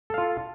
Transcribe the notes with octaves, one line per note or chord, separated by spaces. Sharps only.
F4 A4 F5